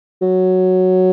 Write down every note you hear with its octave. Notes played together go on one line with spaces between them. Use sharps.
F#3